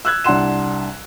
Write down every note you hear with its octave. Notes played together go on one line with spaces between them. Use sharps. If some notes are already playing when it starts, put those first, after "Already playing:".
E6 F#6 G#6
C2 D4 F#5 C6 E7